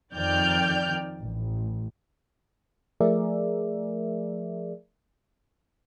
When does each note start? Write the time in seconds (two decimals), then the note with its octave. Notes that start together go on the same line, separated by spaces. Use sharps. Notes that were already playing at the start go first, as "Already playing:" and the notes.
0.14 F2 D#3 D5 G5 F6 G6
1.21 A1
3.00 F3 A3 G#4 A#4 D5 E5